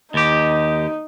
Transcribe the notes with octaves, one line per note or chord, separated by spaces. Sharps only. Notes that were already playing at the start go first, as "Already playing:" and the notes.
D#2 D#4 G4